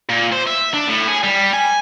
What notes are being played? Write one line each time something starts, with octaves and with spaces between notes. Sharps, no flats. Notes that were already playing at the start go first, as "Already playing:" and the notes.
A#2
C5
E5
D4
A2
G#4
G3
G#5